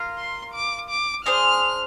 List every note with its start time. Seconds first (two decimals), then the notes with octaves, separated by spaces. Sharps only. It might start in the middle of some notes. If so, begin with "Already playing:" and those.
Already playing: F4 A#4 F5
0.18 C6
0.54 D6
0.89 D6
1.25 D4 G#4 C5 F6